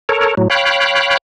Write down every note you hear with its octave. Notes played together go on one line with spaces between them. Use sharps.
A4 A#4 C#5
A2 F#3
C#5 F5 G5 B5 F#6